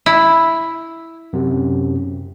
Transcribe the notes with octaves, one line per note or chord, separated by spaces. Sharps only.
E4
F#2 C3